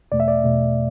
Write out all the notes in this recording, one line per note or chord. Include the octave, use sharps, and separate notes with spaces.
E2 B2 A3 D5
E5
D5
E2 B2 A3